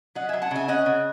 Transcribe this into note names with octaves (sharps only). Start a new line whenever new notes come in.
F#3 D#5 F#5
F#3 E5 G#5
F#5 A5
C#3 E5 G#5
C#4 D#5 F#5
C#3